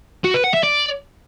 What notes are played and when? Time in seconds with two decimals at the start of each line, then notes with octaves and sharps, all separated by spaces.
0.24 F#4
0.34 B4
0.44 F#5
0.54 E5
0.63 D5